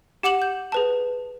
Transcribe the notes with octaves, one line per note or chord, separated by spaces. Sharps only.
G4 F#5 D6 E7 F#7
G6
G#4 B4 A5